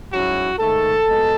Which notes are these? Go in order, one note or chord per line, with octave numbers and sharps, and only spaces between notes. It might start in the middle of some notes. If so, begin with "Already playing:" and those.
G#2 F#3 C#4 E4 F#4
G#2 D#3 A3 A4
B2 G#3